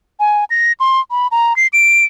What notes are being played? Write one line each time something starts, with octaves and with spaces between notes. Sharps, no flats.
G#5
A#6
C6
B5
A#5
C7
D7